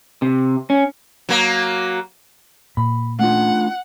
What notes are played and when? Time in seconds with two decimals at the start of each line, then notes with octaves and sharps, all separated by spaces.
0.22 C3
0.70 C#4
1.29 F#3 A#3
2.77 A#2 B5
3.19 A3 D4 F4 F#5